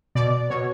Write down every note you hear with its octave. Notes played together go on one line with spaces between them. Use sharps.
B2 D5
B2 C#5